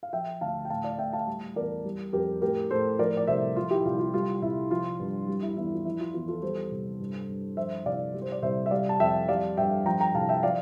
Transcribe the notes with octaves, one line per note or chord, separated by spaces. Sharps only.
F5
F3 E5 G5
D2 F5 A5
G5
A2 F5 A5
D5 F5
A2 E5 G5
F5 A5
G3
E2 A#4 D5
G3
F2 G4 A#4
A2 G4 A#4
A2 A4 C5
F3 A#4 D5
D5
C2 C5 E5
F3 F4
E4 G4
C2 F4
F4
G3 F4
C2 E4
F3 F4
G2
G3
E4
E2 E4
F4
F3 E4
F4
E2 F4
F4 A4
G3 A4 C5
C2
G2
G2
F3 C5 E5
C2 D5 F5
G3
C5
D5
C2 C5 E5
E5
G3 D5 F5
A5
F2 E5 G5
G3 D5 F5
G2 E5 G5
F3 G5 A#5
G5 A#5
C2 F5 A5
E5 G5
F3 D5 F5